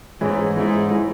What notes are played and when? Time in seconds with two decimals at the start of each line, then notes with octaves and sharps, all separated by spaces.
0.21 G#2 E3 G#3 C#4 E4
0.56 G#2 E3 G#3 C#4 E4
0.91 E3 G#3 C#4 E4